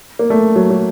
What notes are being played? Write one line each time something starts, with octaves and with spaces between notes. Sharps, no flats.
A#3
A3
F#3
F#3